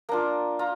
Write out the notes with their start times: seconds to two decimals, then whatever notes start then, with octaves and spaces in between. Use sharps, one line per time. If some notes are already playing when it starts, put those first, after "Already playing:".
0.09 A#3 D4 F4 A#5
0.59 F4 A#5